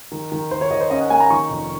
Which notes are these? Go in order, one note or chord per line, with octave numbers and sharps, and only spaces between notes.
D#3
D#3
D#3 C5
C#5
D#3 D#5
C5
C#4 D#5
F#5
A#3 G#5
A#5
D#3 C#6
F1